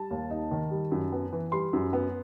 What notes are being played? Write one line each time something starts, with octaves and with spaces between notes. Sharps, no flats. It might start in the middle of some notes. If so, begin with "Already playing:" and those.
Already playing: G3 A5
D#2
D#4
D#3
G3
F#2
B3
E3
G3 C6
F#2
B3